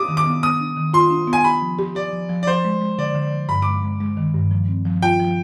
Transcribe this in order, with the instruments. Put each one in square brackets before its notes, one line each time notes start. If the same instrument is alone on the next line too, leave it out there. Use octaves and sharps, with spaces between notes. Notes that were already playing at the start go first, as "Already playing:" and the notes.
Already playing: [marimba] G4 [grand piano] D6 D#6
[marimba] D#3
[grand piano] D6
[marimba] B3
[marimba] B3 [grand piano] D#6
[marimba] D4
D#3
[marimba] F4 [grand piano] C6
[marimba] D4
B3
[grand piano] G#5
[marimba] G4 [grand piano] B5
[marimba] F3
G4
[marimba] G4 [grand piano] D5
[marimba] F3
F3
[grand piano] D5
[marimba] F3 [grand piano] C5
[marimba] G#3
G#3
[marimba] D3 [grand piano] D5
[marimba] D3
F3
[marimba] G2 [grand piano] B5
[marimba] G#3 [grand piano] D6
[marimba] G#3
G#3
D#3
G2
F3
C4
F3
[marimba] F4 [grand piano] G5
[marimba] F3